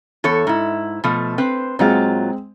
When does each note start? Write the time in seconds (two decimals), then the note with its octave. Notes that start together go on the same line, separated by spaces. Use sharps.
0.24 E2 A4 C#5
0.47 G#2 E4
1.04 B2 F3 A3
1.38 C4 B4 C5
1.79 A#2 F#3 G#3 C4 F4